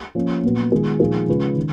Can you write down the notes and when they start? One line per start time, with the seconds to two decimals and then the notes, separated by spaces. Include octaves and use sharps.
0.15 F3 A#3 C#4
0.43 A#2 F#3 B3
0.72 D#3 G#3 B3 F4 G#4
1.00 A#2 F3 A#3 D#4 G#4
1.28 C#3 G#3 C#4 F4 B4
1.56 D#3